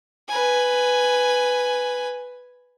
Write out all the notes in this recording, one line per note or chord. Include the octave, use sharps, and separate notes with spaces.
B4 G#5